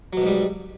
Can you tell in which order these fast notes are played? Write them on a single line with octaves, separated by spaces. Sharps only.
F#3 B2 G#2 G3